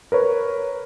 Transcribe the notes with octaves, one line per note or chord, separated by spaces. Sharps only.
A#4 B4 C#5